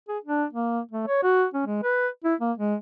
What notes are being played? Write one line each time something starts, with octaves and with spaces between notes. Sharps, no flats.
G#4
D4
A#3
A3
C#5
F#4
C#4
G#3
B4
E4
A#3
G#3